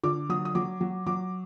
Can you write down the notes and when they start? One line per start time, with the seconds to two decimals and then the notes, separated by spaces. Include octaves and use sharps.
0.03 D3 D6
0.29 F#3 D#6
0.45 D#6
0.55 F#3 D6
0.81 F#3
1.07 F#3 D6